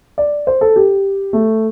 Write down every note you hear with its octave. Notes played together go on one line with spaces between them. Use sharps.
D5
C5
A4
G4
A3